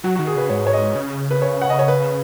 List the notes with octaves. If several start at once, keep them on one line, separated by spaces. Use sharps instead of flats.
F#3 F#4
D#3 F#4
G#4
C#3 B4
G#2 C#5
C#5
D#5
C#3
B4
C#5
F#5
D#5
C#5
B4